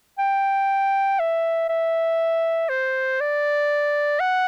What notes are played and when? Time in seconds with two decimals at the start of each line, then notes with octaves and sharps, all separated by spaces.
0.19 G5
1.20 E5
1.69 E5
2.69 C5
3.21 D5
4.20 F#5